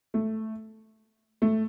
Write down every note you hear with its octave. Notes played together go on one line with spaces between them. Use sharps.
A3
A3